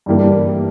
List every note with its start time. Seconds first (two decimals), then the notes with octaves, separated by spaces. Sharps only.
0.06 G2 E3 G3 A#3 D4